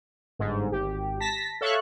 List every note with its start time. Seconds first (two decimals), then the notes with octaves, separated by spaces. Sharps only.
0.39 G1 G#2
0.72 G#1 G4
1.20 A5 A#6 B6
1.61 A4 C#5 E5 F5 C#6 F#6